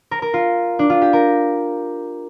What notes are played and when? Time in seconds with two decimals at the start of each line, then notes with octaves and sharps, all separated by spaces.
0.11 A#4
0.22 A#4
0.34 F4
0.79 D4
0.90 F4
1.02 G4
1.13 A#4